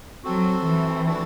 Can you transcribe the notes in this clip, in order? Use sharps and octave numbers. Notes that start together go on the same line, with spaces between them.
F#3 C4 F#4 A4
E3
A3 D4 F#4 A4